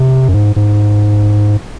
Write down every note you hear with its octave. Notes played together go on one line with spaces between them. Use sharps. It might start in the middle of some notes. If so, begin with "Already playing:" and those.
Already playing: C3
F#2
G#2
G#2